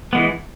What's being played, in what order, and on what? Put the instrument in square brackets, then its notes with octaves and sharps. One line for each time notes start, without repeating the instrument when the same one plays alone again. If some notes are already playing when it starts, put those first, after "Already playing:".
[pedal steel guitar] E3 G#3 B3